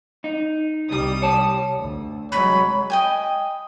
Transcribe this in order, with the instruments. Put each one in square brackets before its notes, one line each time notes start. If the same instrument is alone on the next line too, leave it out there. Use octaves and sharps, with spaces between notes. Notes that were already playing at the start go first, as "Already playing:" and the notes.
[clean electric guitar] D#4
[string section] C2 G3 D#6
[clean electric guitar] C#5 A5
[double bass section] D2
[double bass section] C3 F#3 G#3 [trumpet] C#5 [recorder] B5
[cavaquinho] D#5 G5 G#5